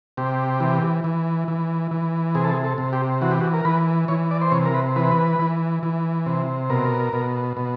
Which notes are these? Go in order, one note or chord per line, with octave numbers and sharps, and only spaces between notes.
C3 G4
E3
E3
E3
E3
C3 G#4
A4
G#4
A4
C3
G4
E3 F#4
G4
F#4
A#4
E3 B4
E3 C#5
D5
C5
C3 C#5
A#4
B4
E3 B4
E3
E3
C3
B2 A#4
B2
B2